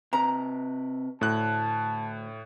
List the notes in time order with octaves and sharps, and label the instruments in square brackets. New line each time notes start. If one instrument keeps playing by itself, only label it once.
[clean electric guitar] C3 B4 [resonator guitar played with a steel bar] A#5
[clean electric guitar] D2 [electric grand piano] A2 F#6 [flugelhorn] A5